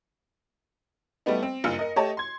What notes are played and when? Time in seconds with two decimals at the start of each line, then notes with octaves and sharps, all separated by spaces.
1.26 G3 A3 B3 D#4
1.43 C4
1.64 F#1 G2 F4 F5 E6 C#7
1.79 A#4 D#5
1.96 A3 G4 C#5 D#5 A5
2.17 C6 G#6